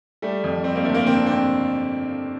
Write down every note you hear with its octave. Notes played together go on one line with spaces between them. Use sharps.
G3 A3
F2
G3 C4
A#3
D3 A3
A#3
D3 C4
D4
D3 C4